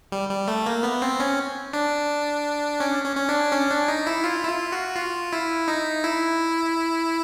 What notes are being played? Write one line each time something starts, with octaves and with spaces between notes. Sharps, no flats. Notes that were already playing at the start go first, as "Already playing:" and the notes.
G3
G3
A3
A#3
B3
C4
C#4
D4
C#4
C#4
C#4
D4
C#4
D4
D#4
E4
F4
E4
F4
F#4
F4
E4
D#4
E4